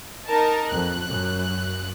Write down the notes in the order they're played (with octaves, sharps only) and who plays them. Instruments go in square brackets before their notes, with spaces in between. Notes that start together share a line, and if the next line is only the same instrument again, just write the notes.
[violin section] D#4 A#4 A5
[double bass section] F2 [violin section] F#6
[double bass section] F#2